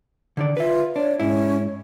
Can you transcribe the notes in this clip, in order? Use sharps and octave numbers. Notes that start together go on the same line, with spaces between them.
D3 D#3 D5
F4 B4 E5
D4 C#5
G#2 C#4 E4